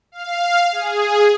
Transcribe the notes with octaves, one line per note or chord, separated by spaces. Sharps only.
F5
G#4